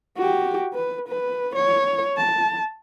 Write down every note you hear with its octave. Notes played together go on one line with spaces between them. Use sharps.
F#4 G4
B4
B4
C#5
A5